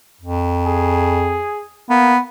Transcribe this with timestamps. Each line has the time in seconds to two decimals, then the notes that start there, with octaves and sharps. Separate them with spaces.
0.21 F2
0.66 G#4
1.90 A#3 B3